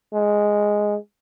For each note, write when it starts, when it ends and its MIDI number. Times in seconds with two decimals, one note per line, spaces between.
0.13 0.95 56